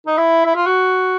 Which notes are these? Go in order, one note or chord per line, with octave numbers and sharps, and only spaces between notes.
D#4
E4
E4
F4
F#4